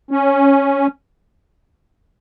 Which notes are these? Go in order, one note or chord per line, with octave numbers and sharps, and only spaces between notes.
C#4